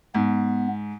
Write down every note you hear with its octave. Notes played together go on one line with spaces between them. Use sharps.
G#2 B3